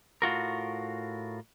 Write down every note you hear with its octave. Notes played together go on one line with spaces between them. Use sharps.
A2 F4 F#4 A#4